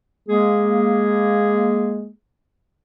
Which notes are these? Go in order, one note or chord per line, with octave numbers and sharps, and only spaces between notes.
G#3 A#3 G#4